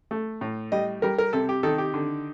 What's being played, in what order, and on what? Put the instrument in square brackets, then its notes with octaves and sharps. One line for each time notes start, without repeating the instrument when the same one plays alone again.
[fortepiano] A3
A2
G3 D#5
G3 A#4
A#4
C3 A4
G4
D#3 A4
G4
D3